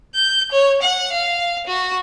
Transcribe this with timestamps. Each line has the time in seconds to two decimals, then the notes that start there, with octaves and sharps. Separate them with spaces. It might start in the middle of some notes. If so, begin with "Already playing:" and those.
0.15 G6
0.52 C#5
0.82 F#5
1.12 F5
1.67 F#4